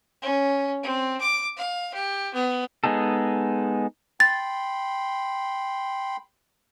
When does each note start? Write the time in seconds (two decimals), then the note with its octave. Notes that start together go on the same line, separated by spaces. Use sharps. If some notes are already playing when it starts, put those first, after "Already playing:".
0.22 C#4
0.83 C4
1.21 D6
1.57 F5
1.94 G4
2.34 B3
2.84 G#3 B3 D#4 G#4 A4
4.20 G5 B5 C6 A6